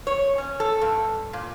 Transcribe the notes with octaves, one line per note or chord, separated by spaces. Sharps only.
C#5
C#4
A4
G2
A#2